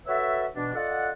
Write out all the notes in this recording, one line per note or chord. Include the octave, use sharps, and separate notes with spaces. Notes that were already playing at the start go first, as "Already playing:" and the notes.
F#4 A4 B4 C#5 E5
B2 E3 D4
F4 A4 D5 D#5 F#5